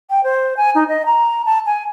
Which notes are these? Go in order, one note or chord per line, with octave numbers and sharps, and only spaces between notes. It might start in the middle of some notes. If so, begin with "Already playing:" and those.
G5
C5
G#5
D#4
D#5
A#5
A5
G#5